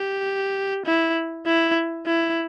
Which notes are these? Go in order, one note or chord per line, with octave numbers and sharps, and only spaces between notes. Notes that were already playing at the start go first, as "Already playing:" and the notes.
Already playing: G4
E4
E4
E4